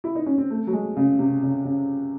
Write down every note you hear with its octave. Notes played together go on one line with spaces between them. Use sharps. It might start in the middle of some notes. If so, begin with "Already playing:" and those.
E4
D#4
C#4
C4
A3
F#3
G#3
C#3
C3
C#3
C#3